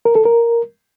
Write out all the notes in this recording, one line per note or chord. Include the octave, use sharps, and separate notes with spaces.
A#4
A4
A#4